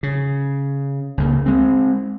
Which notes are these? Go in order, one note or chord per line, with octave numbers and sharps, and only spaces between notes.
C#3
C#2 C#3 A#3
G#3 C4